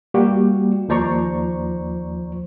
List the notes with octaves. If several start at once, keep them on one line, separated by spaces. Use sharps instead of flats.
G3 A#3 F#4 G4
D#2 F3 C5 D5 A#5 C#6